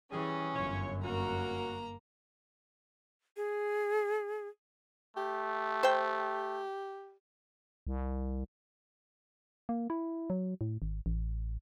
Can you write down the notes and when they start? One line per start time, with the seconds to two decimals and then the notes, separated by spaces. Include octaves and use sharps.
0.12 E3 G3 C#4 G#4
0.54 G1 F#2 F4 C#5
1.04 A#3 C#4 F#4 A#5
3.37 G#4
5.17 A3 G4
5.83 C5 G5
7.87 C2
9.69 A#3
9.90 E4
10.30 F#3
10.61 A2
10.82 G#1
11.06 A1